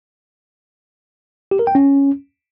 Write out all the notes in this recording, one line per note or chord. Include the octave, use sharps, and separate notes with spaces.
G4
A#4
G5
C#4